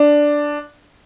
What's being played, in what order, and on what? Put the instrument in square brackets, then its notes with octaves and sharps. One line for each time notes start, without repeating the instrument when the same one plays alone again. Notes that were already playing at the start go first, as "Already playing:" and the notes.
Already playing: [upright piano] D4